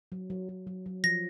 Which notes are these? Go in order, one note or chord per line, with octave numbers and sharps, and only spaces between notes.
F#3
F#3
F#3
F#3
F#3
F3 A#6